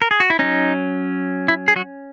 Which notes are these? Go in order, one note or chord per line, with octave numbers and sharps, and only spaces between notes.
A#4
G#4
F#4
E4
F#3 C#4 D#4
E4
G#4
F#3 F#4